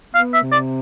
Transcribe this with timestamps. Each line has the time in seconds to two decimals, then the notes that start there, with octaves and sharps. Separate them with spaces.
0.15 B3 F5
0.33 E5
0.42 C3
0.52 D5